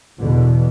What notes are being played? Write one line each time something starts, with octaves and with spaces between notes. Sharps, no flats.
E2 B2 D3